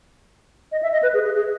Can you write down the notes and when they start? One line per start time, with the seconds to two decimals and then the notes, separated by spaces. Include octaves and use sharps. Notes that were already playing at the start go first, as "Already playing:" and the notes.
0.72 D#5
0.83 E5
0.93 D#5
1.03 B4
1.14 G#4
1.25 G#4
1.35 G#4